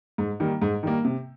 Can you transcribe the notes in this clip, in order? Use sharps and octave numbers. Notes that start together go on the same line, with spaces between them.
G#2
D#3 G3 A#3
G#2
D#3 G3 A#3
C3